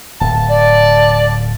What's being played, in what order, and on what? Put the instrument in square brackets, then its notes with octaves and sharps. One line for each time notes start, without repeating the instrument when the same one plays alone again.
[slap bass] D1 [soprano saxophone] A5
[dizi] D5